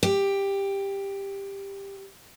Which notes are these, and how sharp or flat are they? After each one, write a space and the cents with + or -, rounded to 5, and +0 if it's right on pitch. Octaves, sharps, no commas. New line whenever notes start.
G4 +10